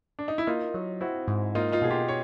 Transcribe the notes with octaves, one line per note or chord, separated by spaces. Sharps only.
D4
D#4
E4
A#3 D#4 F4
F#3
C4 E4 F#4
G#2
A#3 D#4 F4
D#4 F4
B2 G#4
F4 G4
C#5